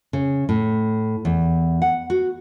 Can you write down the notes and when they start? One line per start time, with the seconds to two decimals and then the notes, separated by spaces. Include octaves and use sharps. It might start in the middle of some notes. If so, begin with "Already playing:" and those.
0.13 C#3
0.49 A2
1.25 E2
1.82 F#5
2.10 F#4